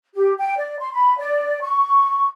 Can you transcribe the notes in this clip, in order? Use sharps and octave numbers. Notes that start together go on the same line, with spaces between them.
G4
G5
D5
C6
B5
D5
C#6